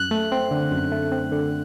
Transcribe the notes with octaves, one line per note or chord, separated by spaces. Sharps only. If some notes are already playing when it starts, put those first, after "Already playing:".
Already playing: F#2 F#6
A3
C4
D3
F#2
A3
C4
D3